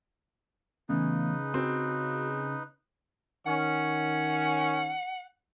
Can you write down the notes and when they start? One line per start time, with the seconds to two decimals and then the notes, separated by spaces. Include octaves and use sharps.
0.89 C#3 E3 A3 B3 D#4 B4
1.54 C4 F#4
3.46 D#3 C#4 F#5